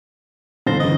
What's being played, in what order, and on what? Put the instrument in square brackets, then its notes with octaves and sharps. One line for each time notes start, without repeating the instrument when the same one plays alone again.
[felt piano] G1 A6 A#6 [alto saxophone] C5
[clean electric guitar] C#3 E3 [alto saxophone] D#5